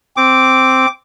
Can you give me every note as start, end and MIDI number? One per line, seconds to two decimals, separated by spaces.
0.17 0.86 60
0.17 0.88 86